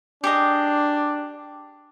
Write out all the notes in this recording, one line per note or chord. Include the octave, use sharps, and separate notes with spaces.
D4 G4 G#4 D#5